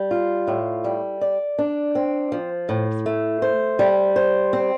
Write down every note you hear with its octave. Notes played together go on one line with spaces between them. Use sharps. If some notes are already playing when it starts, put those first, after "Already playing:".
Already playing: G3
F4
A2
G3
D5
D4
C4
F3
A2
A3
C5
G3
C5
C4